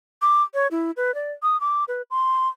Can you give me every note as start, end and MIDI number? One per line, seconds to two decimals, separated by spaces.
0.22 0.43 86
0.54 0.67 73
0.71 0.91 64
0.97 1.14 71
1.15 1.32 74
1.43 1.59 87
1.61 1.84 86
1.88 2.02 71
2.11 2.48 84